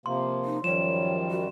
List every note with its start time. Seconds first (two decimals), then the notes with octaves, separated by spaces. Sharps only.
0.06 C3 F3 A#3 C6
0.45 D#4
0.64 F#2 D#3 F3 G3 C#5 E7
1.31 F#4